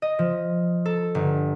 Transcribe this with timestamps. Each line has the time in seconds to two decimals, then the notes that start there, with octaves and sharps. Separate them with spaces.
0.02 D#5
0.19 F3
0.85 A4
1.15 G1